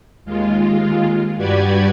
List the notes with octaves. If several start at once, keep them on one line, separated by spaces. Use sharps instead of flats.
D#2 G#3 F4
G2 F#4 G4 B4 D5 G#6